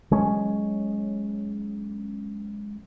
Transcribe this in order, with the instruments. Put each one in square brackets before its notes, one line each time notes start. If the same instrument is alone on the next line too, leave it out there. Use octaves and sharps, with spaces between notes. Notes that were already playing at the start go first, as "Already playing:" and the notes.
[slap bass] F#3 G#3 C#4